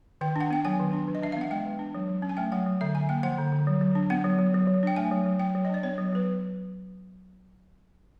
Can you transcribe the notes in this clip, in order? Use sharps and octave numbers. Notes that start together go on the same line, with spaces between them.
D#3 G5
D4 F#5
B3 G5
F#3 G#5
D#3
D4
E3
D#5
D4 E5
F5
B3 F#5
G#3 G5
E3
D4
F#3
F#3
C#4
G#5
A3 G5
F#3 F#5
F#3
D3 E5
D3 G#5
A#3 G5
F3 F#5
D3
D3
F#3
F#3
D4
B3 F#5
F#3
F#3
F#3
F#3
D4 G5
A3 G#5
F#3
F#3
F#3 G5
F#3
D#5
D4 D5
B3 C#5
F#3
F#3 B4